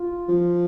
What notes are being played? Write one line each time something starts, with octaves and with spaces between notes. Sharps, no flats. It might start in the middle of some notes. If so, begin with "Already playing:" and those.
Already playing: F4
F3